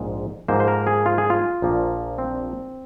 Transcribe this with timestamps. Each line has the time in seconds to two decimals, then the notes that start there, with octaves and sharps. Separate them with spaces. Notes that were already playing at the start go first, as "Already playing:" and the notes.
Already playing: A#1 G#2 G#3
0.48 G#2 F3 A#3 C5
0.60 C5
0.68 A#4
0.87 G#4
1.06 F4
1.18 G#4
1.30 F4
1.62 A#1 A#2 F3 A#3
2.18 C4